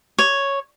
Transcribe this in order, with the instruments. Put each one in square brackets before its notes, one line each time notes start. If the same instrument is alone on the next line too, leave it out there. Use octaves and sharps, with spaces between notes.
[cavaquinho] C#5